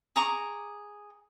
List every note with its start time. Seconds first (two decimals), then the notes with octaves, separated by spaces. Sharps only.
0.16 G#4 A#5 C#6 D6